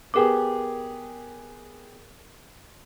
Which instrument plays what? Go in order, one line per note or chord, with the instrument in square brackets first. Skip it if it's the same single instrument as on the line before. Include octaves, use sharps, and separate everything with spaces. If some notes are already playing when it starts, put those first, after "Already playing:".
[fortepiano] B3 G4 G#4 [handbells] A#4 D6